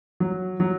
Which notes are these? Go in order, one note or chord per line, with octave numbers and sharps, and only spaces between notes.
F#3
F#3